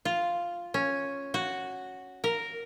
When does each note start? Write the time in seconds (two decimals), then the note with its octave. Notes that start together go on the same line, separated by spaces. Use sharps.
0.05 F4
0.74 C#4
1.34 F#4
2.24 A#4